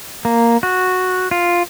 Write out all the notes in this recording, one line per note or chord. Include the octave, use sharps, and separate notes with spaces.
A#3
F#4
F4